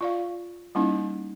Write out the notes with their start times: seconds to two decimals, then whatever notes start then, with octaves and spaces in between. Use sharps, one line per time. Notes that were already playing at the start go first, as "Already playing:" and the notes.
0.01 F4 D5 F5
0.75 G3 A#3 C#4 D#4 E4